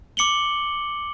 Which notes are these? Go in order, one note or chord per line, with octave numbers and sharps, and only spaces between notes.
D6 C#7 F#7 G7